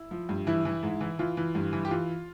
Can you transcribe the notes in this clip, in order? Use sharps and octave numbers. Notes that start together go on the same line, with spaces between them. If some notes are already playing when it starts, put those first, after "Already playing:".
Already playing: E4
F3
G2
E3 E4
E3
G#2
E3
E3 F4
E3
G2
E3
G4
E3 F4